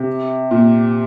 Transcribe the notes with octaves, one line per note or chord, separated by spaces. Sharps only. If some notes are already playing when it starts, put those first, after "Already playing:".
Already playing: C3
A#2